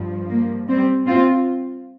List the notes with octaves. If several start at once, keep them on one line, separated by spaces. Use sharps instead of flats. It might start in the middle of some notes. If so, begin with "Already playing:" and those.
Already playing: G2 F3
A#3
G3 C4
C4 F4